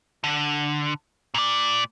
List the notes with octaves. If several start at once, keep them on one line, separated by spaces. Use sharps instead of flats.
D3
A#2 D5